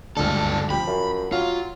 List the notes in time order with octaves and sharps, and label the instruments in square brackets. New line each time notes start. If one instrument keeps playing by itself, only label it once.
[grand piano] D1 C#2 F6 [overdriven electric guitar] G2 A4 [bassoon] D4
[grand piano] F3 [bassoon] G4 [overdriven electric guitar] B5
[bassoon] F#2
[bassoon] F#3 [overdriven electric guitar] F4 [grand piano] F5